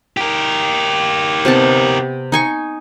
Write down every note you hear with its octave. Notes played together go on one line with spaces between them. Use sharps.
G4 A#4
C3 B3 A5
D#4 G#5 C#6